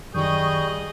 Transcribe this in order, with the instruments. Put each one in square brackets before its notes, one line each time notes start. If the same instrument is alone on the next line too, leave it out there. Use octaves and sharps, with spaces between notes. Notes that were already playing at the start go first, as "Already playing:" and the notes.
[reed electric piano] F#2 D#3 [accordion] G3 D#6 G6 [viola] G#4 D#5 [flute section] C#6